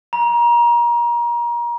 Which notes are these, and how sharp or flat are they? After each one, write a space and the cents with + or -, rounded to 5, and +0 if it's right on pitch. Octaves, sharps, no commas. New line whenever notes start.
A#5 +30